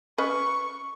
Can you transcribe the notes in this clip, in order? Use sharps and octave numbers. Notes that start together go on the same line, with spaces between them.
C#4 B4 D#5 C#6